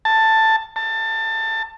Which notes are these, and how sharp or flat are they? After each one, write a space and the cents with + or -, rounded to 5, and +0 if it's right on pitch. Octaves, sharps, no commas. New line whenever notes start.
A5 +10
A5 +25